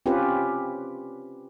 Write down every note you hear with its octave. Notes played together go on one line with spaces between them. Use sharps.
C4 C#4 F4 G4 B4